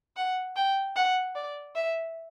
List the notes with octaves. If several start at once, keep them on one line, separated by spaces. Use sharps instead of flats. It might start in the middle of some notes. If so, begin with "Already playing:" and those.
F#5
G5
F#5
D5
E5